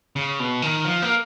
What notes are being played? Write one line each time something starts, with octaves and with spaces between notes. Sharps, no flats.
C#3
B2
D#3
F3
A#3